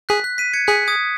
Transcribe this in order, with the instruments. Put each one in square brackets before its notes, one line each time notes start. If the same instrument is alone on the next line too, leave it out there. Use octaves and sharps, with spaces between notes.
[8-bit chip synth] G#4 [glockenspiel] F#6 B6
[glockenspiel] F#6
B6 D#7
G#6 C#7
[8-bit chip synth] G#4 [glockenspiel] F#6 B6
[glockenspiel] D#6 G#6